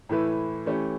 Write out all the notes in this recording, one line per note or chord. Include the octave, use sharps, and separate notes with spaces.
A2 E3 A3 E4 B4
E3 A3 C#4 G4